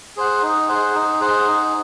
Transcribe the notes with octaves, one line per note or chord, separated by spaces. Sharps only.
G#4 C5 F#5
D#4
G#4 C5 F#5
D#4
G#4 C5 F#5
D#4